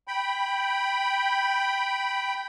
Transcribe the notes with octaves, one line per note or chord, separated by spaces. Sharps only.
G5 B5